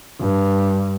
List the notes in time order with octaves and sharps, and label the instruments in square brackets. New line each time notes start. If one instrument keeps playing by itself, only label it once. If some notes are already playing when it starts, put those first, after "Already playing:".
[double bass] G2